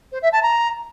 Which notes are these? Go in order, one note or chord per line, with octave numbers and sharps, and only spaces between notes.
C5
E5
A5
A#5